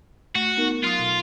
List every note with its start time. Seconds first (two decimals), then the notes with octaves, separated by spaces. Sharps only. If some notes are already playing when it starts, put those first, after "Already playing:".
0.35 A3 F#4
0.57 B3 D#4 A#4
0.83 F#3 F4 C6 D#6
0.99 B2